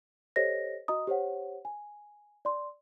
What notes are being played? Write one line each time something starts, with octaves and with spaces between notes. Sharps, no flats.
G4 A4 C5 C#5 D#5 A#6
F#4 D#5 A#5 D#6
G4 C5 C#5 F#5
G#5
D5 C6